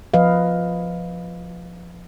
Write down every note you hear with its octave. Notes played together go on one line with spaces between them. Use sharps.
F3 B4 D#5 F5